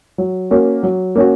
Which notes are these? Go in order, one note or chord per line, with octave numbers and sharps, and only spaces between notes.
F#3
A#3 C#4 F#4
F#3
A#3 C#4 F#4